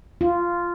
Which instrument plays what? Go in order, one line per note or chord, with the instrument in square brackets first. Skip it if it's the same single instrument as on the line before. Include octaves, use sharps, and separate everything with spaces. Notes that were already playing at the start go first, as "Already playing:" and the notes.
[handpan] F4